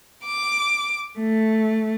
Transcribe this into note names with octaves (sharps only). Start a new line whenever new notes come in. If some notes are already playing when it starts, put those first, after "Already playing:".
D6
A3